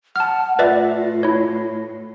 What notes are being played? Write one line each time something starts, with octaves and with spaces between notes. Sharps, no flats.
F#5 A5 F6
A2 F4 B4 D5 E5
E4 C#5